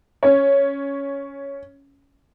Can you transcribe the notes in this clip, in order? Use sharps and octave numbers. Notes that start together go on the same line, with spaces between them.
C#4 C#5